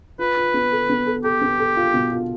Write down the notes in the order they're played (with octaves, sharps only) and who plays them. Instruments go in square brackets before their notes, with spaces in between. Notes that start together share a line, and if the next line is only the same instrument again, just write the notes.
[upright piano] F4 [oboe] B4
[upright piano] F4
B3
A4
B3
A4
[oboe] G4 [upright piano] A4
[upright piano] B3
A4
F4
B2
F4